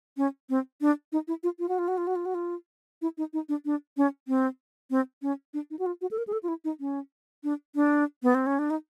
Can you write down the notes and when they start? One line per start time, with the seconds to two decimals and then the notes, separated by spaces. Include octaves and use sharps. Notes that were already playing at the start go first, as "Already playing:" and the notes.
0.17 C#4
0.50 C4
0.81 D4
1.12 D#4
1.28 E4
1.43 F4
1.59 F4
1.69 F#4
1.79 F4
1.88 F#4
1.98 F4
2.07 F#4
2.16 F4
2.26 F#4
2.35 F4
3.02 E4
3.18 D#4
3.33 D#4
3.49 D4
3.65 D4
3.97 C#4
4.28 C4
4.91 C4
5.22 C#4
5.54 D4
5.70 D#4
5.79 F#4
5.86 F4
6.01 F#4
6.11 A4
6.18 A#4
6.27 G#4
6.33 A4
6.43 F4
6.48 E4
6.64 D#4
6.80 C#4
7.44 D4
7.75 D4
8.23 B3
8.35 C4
8.47 C#4
8.59 D4
8.70 D#4